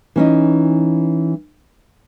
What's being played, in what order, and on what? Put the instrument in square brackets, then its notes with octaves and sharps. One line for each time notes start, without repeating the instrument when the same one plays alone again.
[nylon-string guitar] E3 C#4 D#4